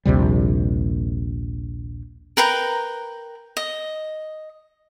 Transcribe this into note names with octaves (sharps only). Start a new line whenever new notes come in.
A#1 D#2 C3 G3
A#4 B4 G5 A#5
D#5